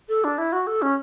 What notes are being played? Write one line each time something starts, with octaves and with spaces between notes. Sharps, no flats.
A4
D4
E4
F#4
A4
C#4